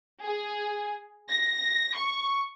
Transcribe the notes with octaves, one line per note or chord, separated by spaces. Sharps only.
G#4
A#6
C#6